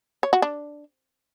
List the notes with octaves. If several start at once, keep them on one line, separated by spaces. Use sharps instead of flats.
C#5
F#4
D4